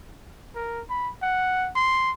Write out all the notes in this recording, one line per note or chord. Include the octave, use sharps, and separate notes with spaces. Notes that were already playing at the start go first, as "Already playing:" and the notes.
A#4
B5
F#5
C6